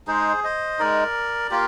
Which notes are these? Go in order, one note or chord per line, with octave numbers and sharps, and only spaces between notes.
G#3 D#4 G#4 C5
C5 D#5
G#3 D#4 A#4 D5
A#3 F4 G4 A#4